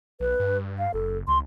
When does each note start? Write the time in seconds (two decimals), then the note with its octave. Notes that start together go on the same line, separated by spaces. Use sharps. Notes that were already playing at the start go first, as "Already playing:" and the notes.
0.20 B1 B4
0.40 G2
0.78 F5
0.94 F#1 A4
1.28 C#2 C6